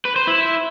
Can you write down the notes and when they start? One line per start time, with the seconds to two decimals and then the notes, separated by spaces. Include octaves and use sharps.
0.05 B4
0.16 C5
0.27 E4